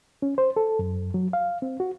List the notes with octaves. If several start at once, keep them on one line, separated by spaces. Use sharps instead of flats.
C#4
C5
A4
F#2
F#3
F5
C4
F#4